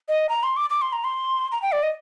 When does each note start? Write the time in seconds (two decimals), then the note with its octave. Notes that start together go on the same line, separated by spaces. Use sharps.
0.09 D#5
0.29 A#5
0.43 C6
0.57 D6
0.70 D6
0.82 C6
0.93 A#5
1.04 C6
1.52 A#5
1.62 G5
1.72 D5
1.83 D#5